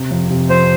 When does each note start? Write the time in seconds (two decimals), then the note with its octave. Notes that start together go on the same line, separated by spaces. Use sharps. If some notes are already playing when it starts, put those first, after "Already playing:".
Already playing: C3
0.11 F2
0.30 C3
0.50 F2 C5